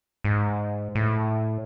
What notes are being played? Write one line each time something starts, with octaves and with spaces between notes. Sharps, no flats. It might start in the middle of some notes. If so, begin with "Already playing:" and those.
G#2
A2